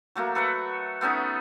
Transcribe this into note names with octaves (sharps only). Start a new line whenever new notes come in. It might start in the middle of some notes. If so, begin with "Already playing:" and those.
F#3 A3 A#3 F#4
A4 B4 E5 F#5
A3 B3 C#4 D#4